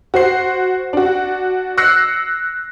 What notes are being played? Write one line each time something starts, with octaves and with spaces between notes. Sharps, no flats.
F#4 C5 C7
D4 F#4
E6 F#6 A#6 C7 C#7